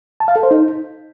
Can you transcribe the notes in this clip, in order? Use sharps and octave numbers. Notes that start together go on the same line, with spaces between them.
A5
F5
A4
C5
D#4